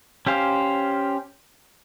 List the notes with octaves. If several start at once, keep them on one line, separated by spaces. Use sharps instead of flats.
C#4 G4 C5 F5